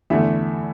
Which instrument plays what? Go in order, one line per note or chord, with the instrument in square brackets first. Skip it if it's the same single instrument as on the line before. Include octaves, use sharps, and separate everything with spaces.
[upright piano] E2 D3 A3 E4 E5